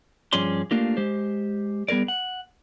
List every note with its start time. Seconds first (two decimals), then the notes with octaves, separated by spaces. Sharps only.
0.33 G2 F3 C#4 G#4 D5 C6
0.71 A3 A#3 D4 F4 G4 A#4
0.97 G#3 G4 C5
1.88 G3 B3 G#4 A#4 D5
2.08 F#5